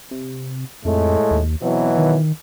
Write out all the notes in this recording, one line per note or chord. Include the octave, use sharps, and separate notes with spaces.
C3
F2 A2 G#3 A3
D#2
B2 E3 F#3 C4
D#3